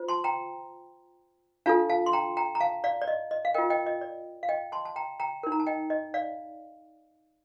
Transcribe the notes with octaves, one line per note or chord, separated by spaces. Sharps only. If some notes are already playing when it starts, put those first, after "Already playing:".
Already playing: F4 C5
A5 C6
G5 A#5
D4 F4 A4 F5 A5
F5 A5
C6
G5 A#5
G5 A#5
A#5
F5 A5
D5 F5
D5
D#5
D#5
F5
F4 A#4 D#5 G5
D#5 G5
D#5
D5
F5
D#5 G5
A5 C6
A5
G5 A#5
G5 A#5
D#4 A#4
A#5
A5
D#5 G5
D#5
D5 F5